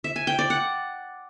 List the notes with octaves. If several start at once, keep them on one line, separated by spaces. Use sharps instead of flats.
E5
G#5
G5
D5
F#5